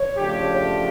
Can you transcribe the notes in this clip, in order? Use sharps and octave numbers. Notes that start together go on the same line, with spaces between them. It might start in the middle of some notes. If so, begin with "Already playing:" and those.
Already playing: C#5
C#3 F3 A3 D4 G4